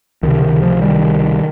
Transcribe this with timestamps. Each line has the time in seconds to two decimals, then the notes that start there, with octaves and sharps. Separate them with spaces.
0.23 C#2 C3 D#3
0.42 D#3
0.62 F3
0.81 D#3 G3